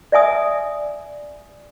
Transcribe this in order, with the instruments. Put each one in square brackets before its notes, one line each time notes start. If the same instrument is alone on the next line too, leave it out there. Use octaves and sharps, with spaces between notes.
[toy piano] D5 E5 G#5 D#6